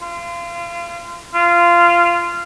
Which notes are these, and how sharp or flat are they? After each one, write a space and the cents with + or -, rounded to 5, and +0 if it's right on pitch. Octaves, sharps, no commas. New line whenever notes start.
F4 -30
F4 -15